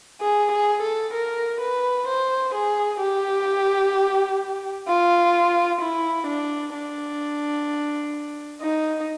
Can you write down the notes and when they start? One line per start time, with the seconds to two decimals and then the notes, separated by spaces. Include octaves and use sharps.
0.21 G#4
0.52 G#4
0.82 A4
1.14 A#4
1.61 B4
2.08 C5
2.55 G#4
3.01 G4
4.88 F4
5.82 E4
6.28 D4
6.74 D4
8.62 D#4